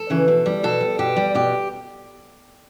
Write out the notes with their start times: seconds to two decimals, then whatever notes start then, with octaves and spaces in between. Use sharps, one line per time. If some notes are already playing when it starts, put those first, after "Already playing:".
Already playing: A4
0.10 C#3 E3
0.28 B2
0.46 G3
0.63 B2 A4
0.81 G3
0.99 B2 G4
1.16 G3
1.35 B2 G4